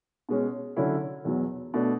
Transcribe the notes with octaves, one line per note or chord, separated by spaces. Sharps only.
B2 G#3 C#4
D3 F#3 C#4 E4
E2 B2 F#3
B2 A3 D4